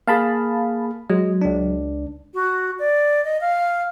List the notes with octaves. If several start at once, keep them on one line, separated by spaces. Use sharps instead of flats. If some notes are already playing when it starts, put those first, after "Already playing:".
A#3 G#4 F5 A5 B5
F#3 G#3
C#2 D4
F#4
D5
D#5
F5